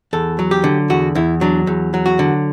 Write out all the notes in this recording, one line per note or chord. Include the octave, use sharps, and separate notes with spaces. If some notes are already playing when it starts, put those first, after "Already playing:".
E2 A4
F#3
G4
D3
E2 F#4
E2 E4
F#3 D4
E2
F#3
F#4
D3